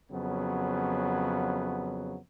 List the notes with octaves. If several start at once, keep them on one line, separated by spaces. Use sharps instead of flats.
F2 C#3 F#3 B3